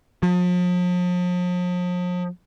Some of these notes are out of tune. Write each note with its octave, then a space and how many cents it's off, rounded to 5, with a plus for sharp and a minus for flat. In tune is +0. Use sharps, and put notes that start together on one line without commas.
F3 +40